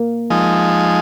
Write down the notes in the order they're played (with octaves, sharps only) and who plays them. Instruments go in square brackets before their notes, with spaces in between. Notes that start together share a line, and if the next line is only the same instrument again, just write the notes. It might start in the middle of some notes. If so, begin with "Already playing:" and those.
Already playing: [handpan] A#3
[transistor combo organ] F3 G#3 D#4